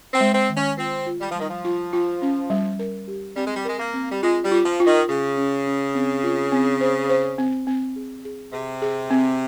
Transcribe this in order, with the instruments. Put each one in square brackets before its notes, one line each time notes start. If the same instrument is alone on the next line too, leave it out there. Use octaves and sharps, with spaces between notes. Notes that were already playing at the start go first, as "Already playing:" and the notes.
[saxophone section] C4
[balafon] G#3
[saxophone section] C4
[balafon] D#3
[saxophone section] C#4
[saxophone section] C4 [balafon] F4
[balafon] F4
[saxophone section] G3
F3
[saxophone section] D#3 [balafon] G3
[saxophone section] F3
[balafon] F4
F4
C#4
G3
A#4
G4
[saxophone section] G3 [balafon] C4
[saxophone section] G#3
G3
[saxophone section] G#3 [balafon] A#4
[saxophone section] A#3
[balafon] C4
[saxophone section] G3
[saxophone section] G#3 [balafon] F4
[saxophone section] G3
[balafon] F4
[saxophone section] F3
[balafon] F4
[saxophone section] D#3
[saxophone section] C#3 [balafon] G#4
[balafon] C#4
C#4
C4
F4
C4
C5
C5
C4
C4
G#4
G#4
[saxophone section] C3 [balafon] G#4
[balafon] G#4
C4